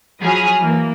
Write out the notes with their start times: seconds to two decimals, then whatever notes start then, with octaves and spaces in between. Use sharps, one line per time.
0.21 F3 F#3 G#4 B5 D#6 F6
0.59 E3 A#3